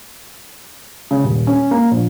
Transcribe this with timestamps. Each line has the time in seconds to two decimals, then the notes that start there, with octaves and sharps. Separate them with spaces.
1.11 C#3
1.24 D#1
1.47 C#4
1.71 A#3
1.91 A#1